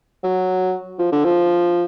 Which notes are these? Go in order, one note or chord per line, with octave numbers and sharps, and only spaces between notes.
F#3
F3
D3
F3